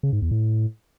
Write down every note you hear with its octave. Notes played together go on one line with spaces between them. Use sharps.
C#3
G#2
E2
A2